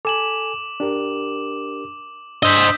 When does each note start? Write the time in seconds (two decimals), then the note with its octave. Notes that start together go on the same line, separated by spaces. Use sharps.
0.05 A4 G#5 D6 E7 F#7
0.80 D4 G4 A#4
2.43 D4 C5 D#5 E6 G6 B6